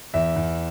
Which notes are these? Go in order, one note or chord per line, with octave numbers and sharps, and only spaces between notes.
E2 E5
E2